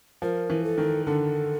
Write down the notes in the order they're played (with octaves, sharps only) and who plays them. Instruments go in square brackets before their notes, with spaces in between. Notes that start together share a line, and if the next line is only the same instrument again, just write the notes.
[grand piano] F3 [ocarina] A#4
[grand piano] E3
[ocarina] A4
[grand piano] D#3
[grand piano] D3 [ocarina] A4